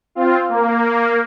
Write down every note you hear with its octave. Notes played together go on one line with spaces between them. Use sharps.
C4 F4
A#3